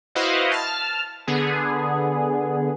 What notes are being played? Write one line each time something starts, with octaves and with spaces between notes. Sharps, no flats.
E4 F#4 B4 C5 D#5 F5
A5 F6
D3 B3 G#4